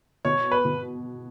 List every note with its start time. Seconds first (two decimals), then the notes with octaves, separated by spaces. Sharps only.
0.25 B2 C#5
0.51 B4
0.65 B2